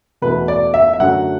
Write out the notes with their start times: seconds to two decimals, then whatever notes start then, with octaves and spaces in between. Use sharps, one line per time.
0.22 E2 B2 A3 B4
0.48 D5
0.74 E5
0.93 E5
1.00 F#2 D3 F#3 A3 F#5